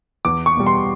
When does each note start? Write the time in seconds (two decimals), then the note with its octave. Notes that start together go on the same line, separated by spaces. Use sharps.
0.25 E2 D6
0.46 C#6
0.57 B2 G3
0.67 C6